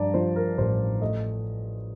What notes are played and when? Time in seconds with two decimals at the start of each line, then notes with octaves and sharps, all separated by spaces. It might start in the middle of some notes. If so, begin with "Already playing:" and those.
Already playing: G2 F3 D5 A5 A#5
0.14 F3 C5
0.36 A#4
0.58 A1 C5
1.01 A3 D#5